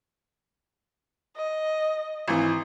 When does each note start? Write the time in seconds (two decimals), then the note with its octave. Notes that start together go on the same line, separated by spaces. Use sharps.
1.36 D#5
2.28 G#1 E3